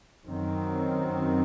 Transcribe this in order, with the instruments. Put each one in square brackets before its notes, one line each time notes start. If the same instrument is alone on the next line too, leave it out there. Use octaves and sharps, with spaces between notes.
[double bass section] F#2 D#3 F#3 C4